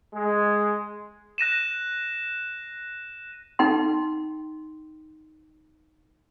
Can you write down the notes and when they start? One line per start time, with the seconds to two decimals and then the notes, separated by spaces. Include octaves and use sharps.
0.13 G#3
1.38 F#6 A#6 D#7 E7
3.59 D#4 G5 C6